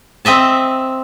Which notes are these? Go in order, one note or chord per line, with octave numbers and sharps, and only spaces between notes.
C4 D#5 E5 A5